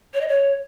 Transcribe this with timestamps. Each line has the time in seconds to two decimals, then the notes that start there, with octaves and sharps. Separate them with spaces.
0.14 C#5
0.21 D#5
0.28 C#5